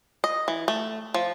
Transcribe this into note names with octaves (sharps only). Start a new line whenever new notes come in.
D#5
E3
A3
F3